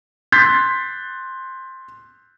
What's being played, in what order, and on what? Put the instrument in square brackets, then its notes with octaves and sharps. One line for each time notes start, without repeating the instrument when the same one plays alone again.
[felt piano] C6 F#6 G6 A6 B6 C7